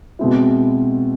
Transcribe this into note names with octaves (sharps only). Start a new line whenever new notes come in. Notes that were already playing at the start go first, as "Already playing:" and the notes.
B2 G#3 C4 E4